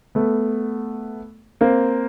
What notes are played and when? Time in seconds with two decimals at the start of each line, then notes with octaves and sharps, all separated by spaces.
0.15 A3 B3
1.61 A#3 C4